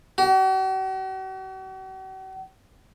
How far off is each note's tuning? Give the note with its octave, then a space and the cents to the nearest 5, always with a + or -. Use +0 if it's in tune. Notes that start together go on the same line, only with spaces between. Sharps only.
F#4 +45